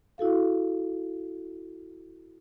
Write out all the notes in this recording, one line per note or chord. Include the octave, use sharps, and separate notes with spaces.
E4 F#4 A4 F5